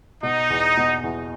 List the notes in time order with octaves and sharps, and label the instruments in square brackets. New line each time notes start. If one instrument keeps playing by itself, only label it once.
[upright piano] B2 [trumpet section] D#4
[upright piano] E2
B2
E2